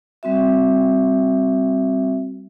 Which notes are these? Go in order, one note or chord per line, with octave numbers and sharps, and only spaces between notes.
G3 C4 F#4 E5